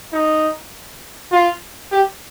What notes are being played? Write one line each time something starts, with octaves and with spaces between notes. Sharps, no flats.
D#4
F4
G4